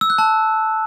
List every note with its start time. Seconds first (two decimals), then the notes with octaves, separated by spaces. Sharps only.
0.01 E6
0.10 F#6
0.18 A5